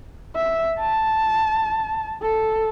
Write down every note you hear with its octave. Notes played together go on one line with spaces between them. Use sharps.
E5
A5
A4